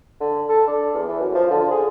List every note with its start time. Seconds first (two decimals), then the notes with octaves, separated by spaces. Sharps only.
0.20 D3
0.49 A4
0.67 D4
0.94 E2
1.08 E3
1.20 F#2
1.34 F3
1.51 D3
1.71 G#4